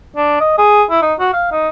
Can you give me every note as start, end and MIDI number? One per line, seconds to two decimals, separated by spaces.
0.16 0.38 62
0.40 0.58 75
0.58 0.83 68
0.90 1.01 64
1.02 1.14 63
1.19 1.32 66
1.33 1.49 77
1.51 1.69 63